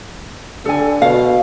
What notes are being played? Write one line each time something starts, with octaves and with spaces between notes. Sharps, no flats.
D3 A4 G#5
B2 F5